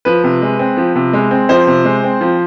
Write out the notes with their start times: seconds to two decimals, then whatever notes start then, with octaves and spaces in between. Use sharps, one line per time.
0.05 F3 B4
0.24 C3
0.42 G#3
0.59 C4
0.77 F3
0.96 C3
1.13 G#3
1.31 C4
1.49 F3 C5
1.67 C3
1.85 G#3
2.04 C4
2.21 F3